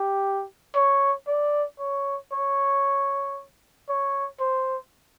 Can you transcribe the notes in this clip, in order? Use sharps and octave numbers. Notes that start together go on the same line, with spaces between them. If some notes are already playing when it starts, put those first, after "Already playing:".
Already playing: G4
C#5
D5
C#5
C#5
C#5
C5